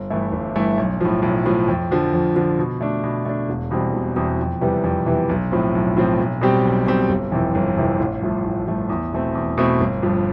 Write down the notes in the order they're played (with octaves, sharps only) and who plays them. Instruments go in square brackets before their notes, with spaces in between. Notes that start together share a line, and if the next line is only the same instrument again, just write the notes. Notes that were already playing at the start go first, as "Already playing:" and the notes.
Already playing: [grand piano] G1
G2 E3 A3 E4
G1
G2 E3 A3 E4
B1
A2 F3
B1
A2 F3
F2
D3 F3
F2
D3 F3
B2
A3 D4
B2
A3 D4
E1
E2 B2 G3 C4
E1
E2 B2 G3 C4
F2
C3 E3 G3 B3
F2
C3 E3 G3 B3
B1
A2 F3 C4
B1
A2 F3 C4
B1
B2 G3 C4 G4
B1
B2 G3 C4 G4
G1
F2 C3 E3
G1
F2 C3 E3
A1
G2 F3 A3
A1
G2 F3 A3
E2
B2 A3 C4
E2
B2 A3 C4
G1
G2 F3